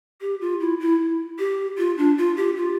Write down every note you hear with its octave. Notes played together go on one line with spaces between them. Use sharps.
G4
F4
E4
E4
G4
F4
D4
F4
G4
F4